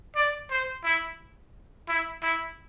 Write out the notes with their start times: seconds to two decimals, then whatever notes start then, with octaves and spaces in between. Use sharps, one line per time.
0.16 D5
0.50 C5
0.84 E4
1.88 E4
2.22 E4